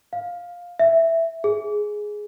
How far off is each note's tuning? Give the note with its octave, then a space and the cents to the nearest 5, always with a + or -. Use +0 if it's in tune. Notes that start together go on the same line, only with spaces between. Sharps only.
F5 +10
E5 +5
G#4 +5